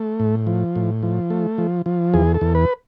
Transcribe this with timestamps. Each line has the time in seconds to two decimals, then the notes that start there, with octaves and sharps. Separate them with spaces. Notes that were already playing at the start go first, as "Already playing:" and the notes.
Already playing: A3
0.20 A2
0.47 F3
0.76 A2
1.03 F3
1.30 A3
1.58 F3
1.86 F3
2.14 E2 G#4
2.35 A4
2.41 E2
2.55 B4